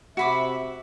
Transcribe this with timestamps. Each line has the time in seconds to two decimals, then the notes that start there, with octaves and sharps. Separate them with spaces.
0.17 C3 F#4 E5 B5 D6